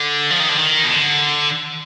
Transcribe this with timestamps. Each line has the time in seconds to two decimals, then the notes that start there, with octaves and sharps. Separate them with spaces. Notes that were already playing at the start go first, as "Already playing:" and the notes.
Already playing: D3
0.30 F3
0.40 D#3
0.49 D3
0.58 D#3
0.84 B2
0.90 D3